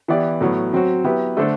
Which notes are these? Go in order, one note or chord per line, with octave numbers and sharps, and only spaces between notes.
E3 B3 E4 G4 D5
A2 F#3 B3
F#3 C4 F#4
F#3 B3 E4 G4 B4
D3 A3 D4 A4 C5